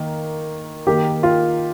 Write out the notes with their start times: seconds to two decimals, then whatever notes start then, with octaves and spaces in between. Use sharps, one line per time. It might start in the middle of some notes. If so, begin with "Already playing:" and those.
Already playing: D#3 A#3
0.87 D#3 A#3 G4
1.23 F4